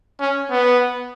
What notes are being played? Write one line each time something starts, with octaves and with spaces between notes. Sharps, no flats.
C#4
B3